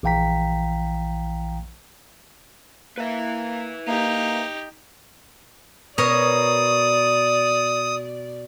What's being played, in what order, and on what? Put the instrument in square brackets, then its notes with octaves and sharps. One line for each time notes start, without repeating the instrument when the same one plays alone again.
[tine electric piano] A#1 E3 F5 G5 A#5 B6
[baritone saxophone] A#3 [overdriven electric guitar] B4 E5
[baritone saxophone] A#3 [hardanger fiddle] D#4 G4
[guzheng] B2 A#4 C#5 [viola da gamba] D5 [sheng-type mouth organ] D#6